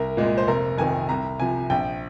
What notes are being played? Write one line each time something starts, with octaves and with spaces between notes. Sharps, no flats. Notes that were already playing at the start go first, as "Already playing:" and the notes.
Already playing: C2 A#4
A#2 G#3
C5
F1 A#4
F2 D#3 G#5
C2 A#5
C3 F3 G#5
A#1 G5